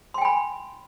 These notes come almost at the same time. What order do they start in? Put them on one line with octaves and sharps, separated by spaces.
C6 G5 G#5 B5